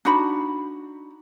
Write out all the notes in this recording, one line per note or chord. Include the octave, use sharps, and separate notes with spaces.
D4 D#4 F#4 B5